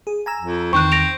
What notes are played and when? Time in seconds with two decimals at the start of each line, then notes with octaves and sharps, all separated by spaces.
0.07 G#4
0.26 G#5 A#5 E6
0.40 F2
0.73 E2 D#3 C4 C#6 F#6
0.92 A#6 D7 F7